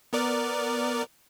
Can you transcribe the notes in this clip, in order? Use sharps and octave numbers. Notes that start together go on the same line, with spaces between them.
B3 A#4 D5